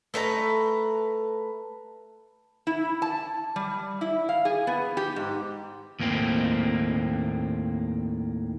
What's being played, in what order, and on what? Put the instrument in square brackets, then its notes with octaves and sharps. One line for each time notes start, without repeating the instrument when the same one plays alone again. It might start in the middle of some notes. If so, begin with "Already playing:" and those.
[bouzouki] A3 B4 C#5 A#5
[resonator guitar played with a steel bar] E4
A5
G3
E4
F5
G#4
B3
G4
G#2
[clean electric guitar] D#2 A2 A#3 C4